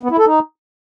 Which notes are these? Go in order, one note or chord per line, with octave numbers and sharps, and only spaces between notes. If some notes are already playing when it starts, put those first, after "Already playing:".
B3
E4
A4
D#4